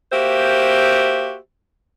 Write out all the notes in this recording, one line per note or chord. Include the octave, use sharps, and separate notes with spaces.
A#3 F#4 G4 C5 E5